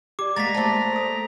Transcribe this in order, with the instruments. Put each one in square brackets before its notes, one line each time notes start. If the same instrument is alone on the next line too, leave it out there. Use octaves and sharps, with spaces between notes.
[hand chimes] G4 D5 [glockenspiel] D6
[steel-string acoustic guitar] G#3 A#3 F#5 [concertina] A#5 [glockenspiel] A6 B6
[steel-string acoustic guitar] A3 D5 [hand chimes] A#3 C5 A5
[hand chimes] A4 D#6